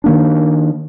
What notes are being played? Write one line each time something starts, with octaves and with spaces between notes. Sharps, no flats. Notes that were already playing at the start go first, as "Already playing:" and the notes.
D#3 A#3 D4